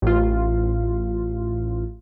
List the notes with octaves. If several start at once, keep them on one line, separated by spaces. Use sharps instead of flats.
A1 F4